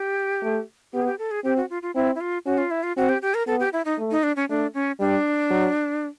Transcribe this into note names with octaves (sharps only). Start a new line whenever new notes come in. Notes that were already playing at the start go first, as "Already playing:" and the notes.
Already playing: G4
A3
B3 G4
G#4
G4
A4
G#4
C4 G4
F#4
F4
F4
C4 E4
E4
F4
C#4 F#4
F4
E4
F4
C4 F#4
G4
G4
A#4
B3 A4
G4
E4
D#4
A3
D#4
D4
C#4
A3 D4
C#4
G3 D4
F#3